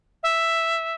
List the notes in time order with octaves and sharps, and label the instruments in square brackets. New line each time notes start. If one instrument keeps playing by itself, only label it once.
[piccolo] E5